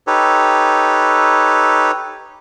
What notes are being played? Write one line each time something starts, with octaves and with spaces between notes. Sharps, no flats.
D#4 G4 A4 B4 C#5